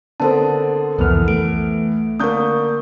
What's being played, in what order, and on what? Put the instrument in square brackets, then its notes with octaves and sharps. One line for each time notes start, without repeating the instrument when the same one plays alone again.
[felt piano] D3 B3 C4 [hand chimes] A4 A#4 A5
[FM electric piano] C2 F2 F6 [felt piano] E3 B3
[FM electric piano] A3 [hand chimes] D7
[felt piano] D3 A#3 G6 [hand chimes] A#4 C#6 D#6